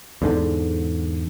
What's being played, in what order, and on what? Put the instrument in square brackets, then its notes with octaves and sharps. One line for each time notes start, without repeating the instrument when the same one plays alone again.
[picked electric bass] E2 G#2 D3